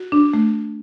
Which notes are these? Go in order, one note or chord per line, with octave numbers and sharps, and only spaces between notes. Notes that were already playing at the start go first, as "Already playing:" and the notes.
Already playing: F#4
D4
A3